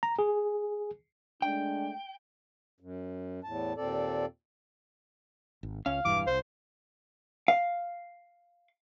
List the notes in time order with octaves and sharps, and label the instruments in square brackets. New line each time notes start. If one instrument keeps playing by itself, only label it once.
[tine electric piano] A#5
G#4
[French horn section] G#3 A3 D4 [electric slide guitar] G5
[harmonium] F#2
E2 A2 A5
D#2 A#2 C4 A4 D5
[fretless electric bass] G#1
[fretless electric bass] C#2 C#4 [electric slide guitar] F5
[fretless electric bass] E1 G2 E3 [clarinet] D6
[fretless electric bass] C2 [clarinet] C5
[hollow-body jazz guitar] F5